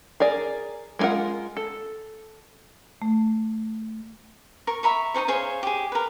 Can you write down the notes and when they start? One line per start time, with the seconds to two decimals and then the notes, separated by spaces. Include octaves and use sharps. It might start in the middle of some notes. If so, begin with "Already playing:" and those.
0.20 G#4 A#4 D5
0.99 G#3 C4 F4 A#4 F#5
1.57 A4
3.02 A3
4.67 A#4 C#6
4.83 E5 A#5 B5 C#6
5.14 D#4 G#4 C5 C#6
5.28 G#4 C5 C#5 F5
5.63 G4 G#4
5.92 A#4 B4